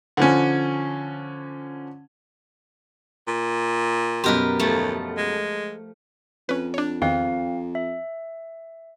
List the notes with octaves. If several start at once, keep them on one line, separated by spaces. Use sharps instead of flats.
D3 F3 C#4
A#2
F#2 B2 G4 A#4 B4 C6
D#2 F3 A3
G#3
F2 C#4 B4
D4 C#5
E2 D#3 C4 F5
E5